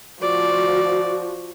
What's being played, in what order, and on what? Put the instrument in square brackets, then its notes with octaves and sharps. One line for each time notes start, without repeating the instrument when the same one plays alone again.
[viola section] F3 F#4 [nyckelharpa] D5